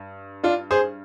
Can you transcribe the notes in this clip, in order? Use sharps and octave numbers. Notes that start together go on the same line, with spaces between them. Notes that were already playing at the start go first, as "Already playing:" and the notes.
Already playing: G2
D4 F4
G#4 C5